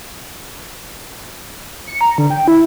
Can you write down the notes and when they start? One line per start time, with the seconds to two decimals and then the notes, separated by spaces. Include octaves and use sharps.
1.87 C#7
2.01 A#5
2.18 D3
2.30 G5
2.48 E4